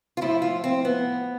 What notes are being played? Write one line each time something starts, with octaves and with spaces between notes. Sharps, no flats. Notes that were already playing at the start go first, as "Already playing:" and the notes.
F4
A2 F3 E4
F4
C4
B3